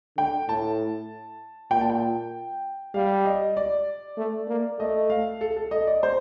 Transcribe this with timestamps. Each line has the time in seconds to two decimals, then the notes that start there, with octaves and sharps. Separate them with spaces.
0.17 D3 G5
0.48 A2 A5
1.71 A#2 G5
1.81 A5
1.89 G5
2.94 G3 F5
3.25 D#5
3.57 D5
4.17 A3
4.48 A#3
4.79 A3 D#5
5.10 F5
5.41 A4
5.57 A4
5.71 D#5
5.87 D5
6.03 C5